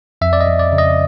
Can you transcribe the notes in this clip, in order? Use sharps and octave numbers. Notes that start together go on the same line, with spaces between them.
F2 E5
D5
D#5
F2
D5
C#3
D#5